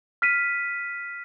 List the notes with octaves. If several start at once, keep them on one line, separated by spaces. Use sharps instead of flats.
F6 B6 D#7